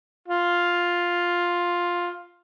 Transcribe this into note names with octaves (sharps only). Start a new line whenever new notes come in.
F4